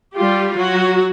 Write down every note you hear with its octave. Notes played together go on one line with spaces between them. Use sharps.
G3 F4 G4
F#3 F#4